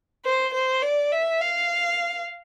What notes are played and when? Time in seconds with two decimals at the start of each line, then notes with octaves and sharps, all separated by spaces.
0.25 C5
0.54 C5
0.82 D5
1.12 E5
1.41 F5